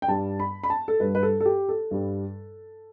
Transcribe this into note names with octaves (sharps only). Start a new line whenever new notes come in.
G5
G2 G3 A5
B5
B5
A5
A4
G2 G3 B4
B4
A4
A4
G4
A4
G2 G3